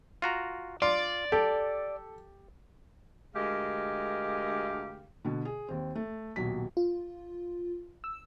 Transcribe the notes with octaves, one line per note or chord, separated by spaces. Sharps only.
F4 F#4 A#5
F4 D5 C6
G4 A4
D2 G#3 G4 G#4 A#4 F5
B2 D3
G#4
D#2 C4
A3
D#1 B1 F#3 B6
F4
E6